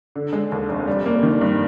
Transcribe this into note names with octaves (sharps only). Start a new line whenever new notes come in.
D3
G#3
D#2
F1
G3
A#3
D#3
G2